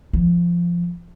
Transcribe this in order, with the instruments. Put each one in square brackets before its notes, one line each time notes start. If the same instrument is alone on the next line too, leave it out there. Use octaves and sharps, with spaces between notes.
[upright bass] F3